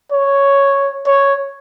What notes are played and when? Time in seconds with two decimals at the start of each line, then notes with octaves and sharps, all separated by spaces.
0.12 C#5
1.06 C#5